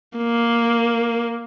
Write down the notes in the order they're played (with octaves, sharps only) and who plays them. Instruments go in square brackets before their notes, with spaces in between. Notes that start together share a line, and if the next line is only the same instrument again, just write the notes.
[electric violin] A#3